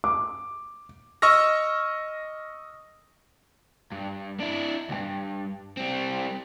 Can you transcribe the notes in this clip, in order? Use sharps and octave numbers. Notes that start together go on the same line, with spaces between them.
D6
D#5 C#6 E6 F6 A#6
G2
D4 E4
D2 G2
G3 C4